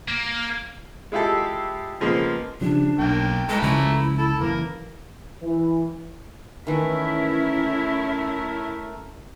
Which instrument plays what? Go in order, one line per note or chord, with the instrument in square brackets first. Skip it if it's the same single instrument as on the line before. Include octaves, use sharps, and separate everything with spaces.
[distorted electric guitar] A#3
[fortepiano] G#3 E4 F4 G4 A4
C#3 F3 G#3 A#3 B3
[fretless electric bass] C#3 F3 G3 [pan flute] D4
[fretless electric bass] B1 [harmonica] A#3 G5
[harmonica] E3 A3 A#5 [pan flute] G#3
[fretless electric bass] C#2 C#3 F3 [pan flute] E4
[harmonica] A4
[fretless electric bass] F#1 E3 [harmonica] A#3
[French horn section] E3
[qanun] D#3 E3 [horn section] A3 A#4 [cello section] C#4 E4